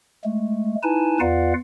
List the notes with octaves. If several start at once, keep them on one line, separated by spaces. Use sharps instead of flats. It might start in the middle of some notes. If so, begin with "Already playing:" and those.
G#3 A3
D#4 E4 B4 G#5 A5
E2 F4 B4 D5 F5 F#5